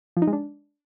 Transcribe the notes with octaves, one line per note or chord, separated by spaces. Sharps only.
F3
D#4
G#3
D4